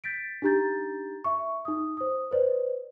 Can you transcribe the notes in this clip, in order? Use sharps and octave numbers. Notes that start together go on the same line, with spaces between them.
G6 A6 B6 D7
D4 D#4 G4 A#5 G6 A6
E5 C#6
D#4 D#6
C5 D#6
B4 C5 D5